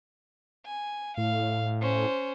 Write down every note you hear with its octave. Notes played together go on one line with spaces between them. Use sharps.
G#5
A2 F5
C#4 C5